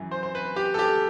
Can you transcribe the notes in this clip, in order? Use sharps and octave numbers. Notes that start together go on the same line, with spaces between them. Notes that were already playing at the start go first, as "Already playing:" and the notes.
Already playing: F#2 E3
C5
C5
B4
G4
A4
G4